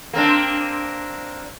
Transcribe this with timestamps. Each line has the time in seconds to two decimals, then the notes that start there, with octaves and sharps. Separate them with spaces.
0.13 A#3 C4 D4